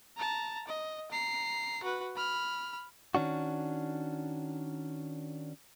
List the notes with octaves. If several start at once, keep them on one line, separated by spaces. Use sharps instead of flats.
A5 A#5
D#5
A#5 C7
F#4 B4
B5 F6
D#3 C#4 D4 F#4